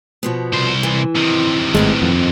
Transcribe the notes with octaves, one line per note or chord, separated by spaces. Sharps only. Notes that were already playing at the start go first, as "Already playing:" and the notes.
B2 F3 B3
C2 C5
E3
C3 D#3
G#1 A2 G#3 B3 E4
F2